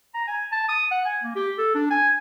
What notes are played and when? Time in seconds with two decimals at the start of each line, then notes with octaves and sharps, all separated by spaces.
0.14 A#5
0.27 G#5
0.52 A5
0.69 D#6
0.91 F#5
1.05 G#5
1.23 A#3
1.36 G4
1.58 A4
1.75 D4
1.90 G#5